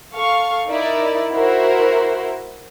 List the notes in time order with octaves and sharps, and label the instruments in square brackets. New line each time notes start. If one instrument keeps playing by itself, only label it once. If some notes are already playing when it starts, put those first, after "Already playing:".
[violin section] A4 F5 C#6
D#4 E4 A#4 D5
E4 F#4 A#4 C5